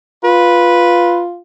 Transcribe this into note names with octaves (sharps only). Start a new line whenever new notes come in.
F4 B4